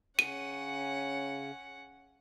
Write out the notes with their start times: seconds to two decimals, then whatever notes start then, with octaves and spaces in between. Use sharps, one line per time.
0.19 C#3 C#4 F#5 D#7